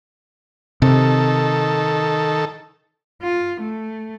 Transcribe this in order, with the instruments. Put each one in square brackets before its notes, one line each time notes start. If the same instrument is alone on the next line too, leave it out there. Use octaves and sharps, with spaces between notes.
[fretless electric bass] C3 [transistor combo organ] D#3 A4
[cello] F4
A3